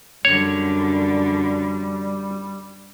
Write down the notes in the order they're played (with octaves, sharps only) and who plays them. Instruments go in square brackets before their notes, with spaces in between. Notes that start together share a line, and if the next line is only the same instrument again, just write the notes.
[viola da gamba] F#2 D3 [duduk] G3 [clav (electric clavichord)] C#5